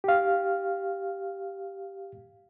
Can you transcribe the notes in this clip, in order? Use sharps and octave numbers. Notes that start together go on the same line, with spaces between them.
G4 F5